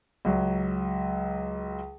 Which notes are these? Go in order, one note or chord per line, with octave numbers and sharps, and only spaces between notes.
C#2 F#3